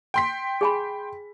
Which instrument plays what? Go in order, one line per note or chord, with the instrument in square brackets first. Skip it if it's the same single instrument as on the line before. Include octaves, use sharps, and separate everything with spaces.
[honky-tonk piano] G5 C6 B6
[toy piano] G#4 G#5 B5